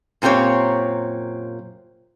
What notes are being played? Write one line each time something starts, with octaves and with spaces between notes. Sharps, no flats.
F#2 A#2 C4 G4 C#5